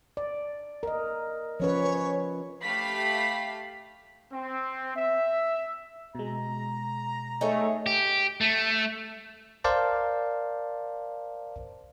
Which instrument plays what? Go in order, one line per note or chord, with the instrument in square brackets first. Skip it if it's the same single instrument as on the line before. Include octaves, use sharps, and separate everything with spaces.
[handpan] D5
A#4 D#5
[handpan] F3 C#4 B4 [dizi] C#5
[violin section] A3 G4 F5 B5 B6
[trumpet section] C4
E5
[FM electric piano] B2 G#3 [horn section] A#5
[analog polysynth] A3 [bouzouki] D#4 G#4 C#5
[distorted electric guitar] G4
A3
[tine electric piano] A#4 C5 D5 F5 A5